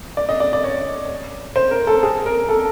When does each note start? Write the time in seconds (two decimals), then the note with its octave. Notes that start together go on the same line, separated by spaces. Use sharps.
0.17 D5
0.29 D#5
0.40 D5
0.53 D5
0.64 C#5
1.56 C5
1.71 A#4
1.87 A4
2.03 G#4
2.26 A#4
2.49 A4